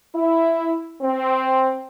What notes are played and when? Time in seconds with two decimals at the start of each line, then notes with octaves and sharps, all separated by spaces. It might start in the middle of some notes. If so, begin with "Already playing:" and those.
0.15 E4
1.02 C4